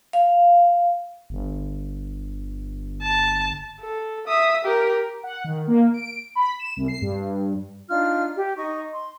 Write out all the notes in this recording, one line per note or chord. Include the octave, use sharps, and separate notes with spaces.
F5
G1
A5
A4
E5 D#6
G4 A#4
F#5
D#3
A#3
D7
B5
E7
C2
C7
G2
D4 D#4 F4 F6
G4
D#4 D#5 C#6
C6